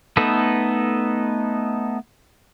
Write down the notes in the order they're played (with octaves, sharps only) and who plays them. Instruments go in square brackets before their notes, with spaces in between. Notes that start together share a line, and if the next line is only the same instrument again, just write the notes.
[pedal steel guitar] A3 B3 D#4 A4 B4